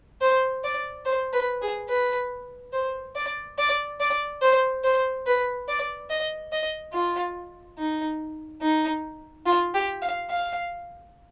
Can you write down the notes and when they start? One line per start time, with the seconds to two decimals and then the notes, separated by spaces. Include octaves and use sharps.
0.21 C5
0.64 D5
1.05 C5
1.33 B4
1.62 G#4
1.89 B4
2.73 C5
3.15 D5
3.58 D5
4.00 D5
4.42 C5
4.84 C5
5.26 B4
5.68 D5
6.10 D#5
6.52 D#5
6.93 F4
7.78 D#4
8.62 D#4
9.46 F4
9.74 G4
10.02 F5
10.30 F5